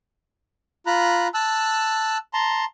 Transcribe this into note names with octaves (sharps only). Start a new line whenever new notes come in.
F4 A#5 B5 F#6
A5 E6 F#6
A5 A#5 C6